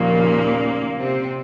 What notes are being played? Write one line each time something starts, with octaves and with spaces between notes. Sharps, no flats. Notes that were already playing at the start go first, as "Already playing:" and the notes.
Already playing: D#2 A#2 C#3 F3 A#3
C3 C4